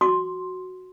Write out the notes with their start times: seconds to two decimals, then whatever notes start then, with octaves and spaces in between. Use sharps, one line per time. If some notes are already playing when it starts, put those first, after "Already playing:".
0.01 F#4 C6 D6